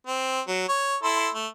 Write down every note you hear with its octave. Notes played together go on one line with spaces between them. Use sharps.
C4
F#3
C#5
E4 A4 C6
A3